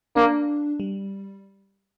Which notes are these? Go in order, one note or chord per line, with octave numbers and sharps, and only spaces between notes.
A#3 D4
G3